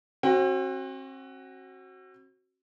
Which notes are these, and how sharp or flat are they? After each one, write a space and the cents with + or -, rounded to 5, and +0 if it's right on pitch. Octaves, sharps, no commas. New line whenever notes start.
C4 +40 F#4 +10